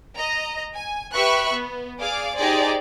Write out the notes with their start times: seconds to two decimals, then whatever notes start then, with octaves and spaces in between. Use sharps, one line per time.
0.17 D#5 A#5
0.76 G#5
1.13 G4 B4 E5 B5 C#6 F#6
1.53 B3
2.01 G#4 D5 F5 D6
2.37 D#4 G4 G#4 C5 D5